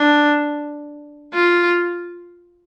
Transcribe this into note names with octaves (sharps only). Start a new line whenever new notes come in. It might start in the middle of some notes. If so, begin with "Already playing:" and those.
Already playing: D4
F4